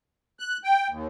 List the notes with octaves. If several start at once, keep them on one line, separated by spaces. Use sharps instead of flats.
F#6
G5
D#2